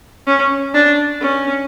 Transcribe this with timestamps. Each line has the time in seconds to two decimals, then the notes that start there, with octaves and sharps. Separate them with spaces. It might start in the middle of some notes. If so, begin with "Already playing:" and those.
0.27 C#4
0.74 D4
1.21 C#4